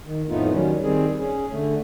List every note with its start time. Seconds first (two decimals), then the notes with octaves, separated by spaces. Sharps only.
0.06 D#3
0.29 F2 A2 A3 B3 D#4 F4
0.51 D#3 F#3 G3 C#4
0.83 D#3 G3 C4 G#4
1.20 C#4 G#4
1.51 D3 A3